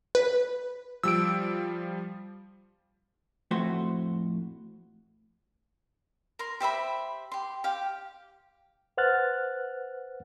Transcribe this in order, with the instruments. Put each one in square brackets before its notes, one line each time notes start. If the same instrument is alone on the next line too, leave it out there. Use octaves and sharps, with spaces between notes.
[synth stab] B4
[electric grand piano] F3 G3 [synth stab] E6 D7
[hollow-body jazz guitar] F2 A2 A3 F#4 C5
[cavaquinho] A#4 C6
G4 C5 E5 B5
G4 C6
G4 F5 G5
[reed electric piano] B4 C5 F#5 F6 F#6 A6